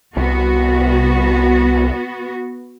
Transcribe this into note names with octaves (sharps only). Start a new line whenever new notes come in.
C2 B3 F#4